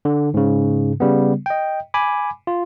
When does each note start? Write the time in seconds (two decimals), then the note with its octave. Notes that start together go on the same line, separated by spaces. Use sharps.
0.05 D3
0.34 G#2 C#3
1.00 C#3 G3 B3
1.46 D#5 G5
1.94 G#5 B5 D6
2.47 F4